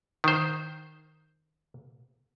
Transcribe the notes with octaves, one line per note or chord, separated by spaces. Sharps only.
D#3 C5